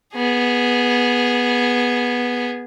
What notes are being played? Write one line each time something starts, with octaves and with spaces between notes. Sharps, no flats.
B3 G#4